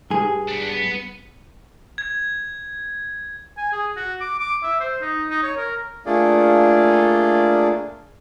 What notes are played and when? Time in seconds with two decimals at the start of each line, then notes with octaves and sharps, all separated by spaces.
0.10 G2 G#4
0.49 B3 D4
0.70 B3
1.98 G#6
3.57 G#5
3.72 G#4
3.96 F#4
4.21 D6
4.40 D6
4.63 E5
4.80 C5
5.02 D#4
5.30 D#4
5.43 C#5
5.57 A#4
6.06 A3 A#3 D4 F4 G#4 D5